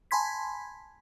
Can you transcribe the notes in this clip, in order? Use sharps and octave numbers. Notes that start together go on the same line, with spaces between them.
G#5 A5 B5 C6 G#6 B6